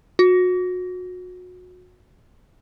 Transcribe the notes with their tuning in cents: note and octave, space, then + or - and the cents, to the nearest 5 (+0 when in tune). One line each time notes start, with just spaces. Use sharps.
F#4 -30